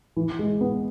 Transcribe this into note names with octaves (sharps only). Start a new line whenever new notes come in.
E3
G#3
B3